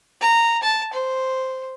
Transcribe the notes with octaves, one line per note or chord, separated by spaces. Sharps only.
A#5
A5
C5